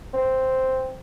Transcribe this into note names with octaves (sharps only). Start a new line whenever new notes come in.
C4